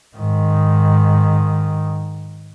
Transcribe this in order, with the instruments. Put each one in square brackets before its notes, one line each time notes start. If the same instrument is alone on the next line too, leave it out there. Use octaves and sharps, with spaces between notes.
[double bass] G#2 D#3